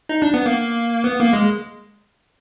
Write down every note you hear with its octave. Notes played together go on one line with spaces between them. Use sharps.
D#4
D4
B3
A#3
B3
A#3
G#3